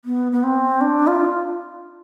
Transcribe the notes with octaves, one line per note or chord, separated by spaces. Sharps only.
B3
B3
C4
D4
F4